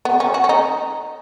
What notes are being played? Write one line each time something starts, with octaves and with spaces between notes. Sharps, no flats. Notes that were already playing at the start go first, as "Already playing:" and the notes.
B3
C#4
F#4
C#4
D#4